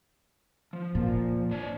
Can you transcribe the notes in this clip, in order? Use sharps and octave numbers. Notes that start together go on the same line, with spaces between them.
F3
A#2
D4 C#5